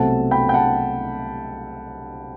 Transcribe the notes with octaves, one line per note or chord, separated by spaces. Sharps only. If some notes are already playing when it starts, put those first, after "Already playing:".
Already playing: C2 B2 F#3 A3 C4 F#5 A5
G5 B5
G5
F#5 A5